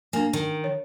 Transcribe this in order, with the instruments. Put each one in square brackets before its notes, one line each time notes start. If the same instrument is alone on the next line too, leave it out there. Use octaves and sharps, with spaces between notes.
[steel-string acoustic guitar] A#3 [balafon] D4 G#5
[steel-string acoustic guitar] D#3
[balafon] C#5